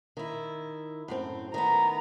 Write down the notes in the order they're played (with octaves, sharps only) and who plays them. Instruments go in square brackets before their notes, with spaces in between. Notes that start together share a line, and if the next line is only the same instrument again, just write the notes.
[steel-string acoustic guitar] D#3 E4
F#2 A2 C4
[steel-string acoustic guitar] D#3 A3 B3 [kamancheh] A#5